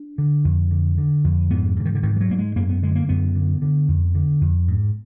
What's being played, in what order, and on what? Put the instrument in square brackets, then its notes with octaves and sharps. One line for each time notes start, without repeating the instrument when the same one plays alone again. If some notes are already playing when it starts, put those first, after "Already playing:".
Already playing: [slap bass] D4
D3
F2
D3
D3
F2
G#2 B3
G#2 D3
D#3
D3
G#2 D#3
F3
F#3
G#2 A#3
G#3
F#2 A#3
B3
D3 G#3
A#3
F#2 B3
D3
D3
F2
D3
F2
G#2